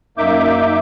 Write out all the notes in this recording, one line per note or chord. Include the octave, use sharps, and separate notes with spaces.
F#2 A#3 D#4 E5 D6 G6